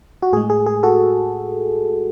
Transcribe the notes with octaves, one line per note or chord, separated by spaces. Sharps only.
F#4
A2 G#3 G#4
G#4
G#4
F#4 A4